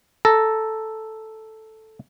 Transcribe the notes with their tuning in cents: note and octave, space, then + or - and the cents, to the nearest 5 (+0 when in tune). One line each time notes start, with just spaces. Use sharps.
A4 +0 A#5 +0